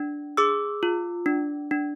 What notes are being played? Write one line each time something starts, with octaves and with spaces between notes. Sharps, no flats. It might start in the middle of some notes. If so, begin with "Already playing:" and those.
Already playing: D4
G#4 D6 E6
F4
D4
D4